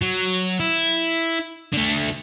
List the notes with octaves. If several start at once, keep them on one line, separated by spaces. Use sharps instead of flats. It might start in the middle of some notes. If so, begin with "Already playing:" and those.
F#3
E4
D3 A3